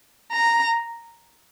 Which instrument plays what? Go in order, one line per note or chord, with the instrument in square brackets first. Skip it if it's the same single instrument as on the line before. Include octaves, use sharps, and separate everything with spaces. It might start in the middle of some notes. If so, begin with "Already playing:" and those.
[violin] A#5